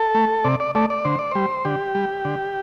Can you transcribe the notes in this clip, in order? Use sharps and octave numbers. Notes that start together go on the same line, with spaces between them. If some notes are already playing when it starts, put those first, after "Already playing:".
Already playing: A4
A3
C3 D5
D5
A3 D5
D5
D3 C5
D5
G3 C5
D3 G4
G3
D3